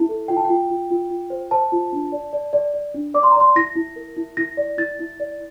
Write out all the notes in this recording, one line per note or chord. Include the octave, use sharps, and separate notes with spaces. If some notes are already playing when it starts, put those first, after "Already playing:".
Already playing: E4
A4
F4 G5
A5
F4 G5
F4
F4
F4
C5
C5 A5
F4
D4
D5
D5
D5
D5
D4
D5 D6
C6
A#5
D5 C6
E4 A#6
E4
A#4
E4
E4 A#6
D5
E4 A6
E4
D5